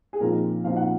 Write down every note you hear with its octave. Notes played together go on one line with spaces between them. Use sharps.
G#4
A#2 F3 C4 D#4 A#4
A#2 F3 C4 D#4 F5
F#5